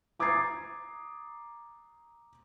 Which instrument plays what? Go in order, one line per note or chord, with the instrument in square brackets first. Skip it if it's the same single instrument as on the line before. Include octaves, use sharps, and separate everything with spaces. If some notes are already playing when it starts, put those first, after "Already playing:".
[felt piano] A#5 D6 D#6 G#6 A6 C7